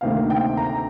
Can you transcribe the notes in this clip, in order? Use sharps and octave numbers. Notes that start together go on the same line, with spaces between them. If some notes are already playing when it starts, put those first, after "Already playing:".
D2 C3 D#3 A#3 F5
G5
A#5